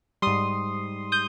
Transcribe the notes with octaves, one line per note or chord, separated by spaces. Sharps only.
G#2 G3 C6 D#6
D#6 G6